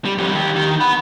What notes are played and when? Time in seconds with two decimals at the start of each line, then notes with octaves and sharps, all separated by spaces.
0.05 G3
0.18 F2 G3
0.35 D#3 G4
0.56 D#3
0.81 F#5 B5